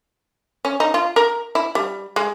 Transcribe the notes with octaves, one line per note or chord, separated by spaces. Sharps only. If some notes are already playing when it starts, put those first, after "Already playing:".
C#4
D#4
F4
A#4
E4
G3
G#3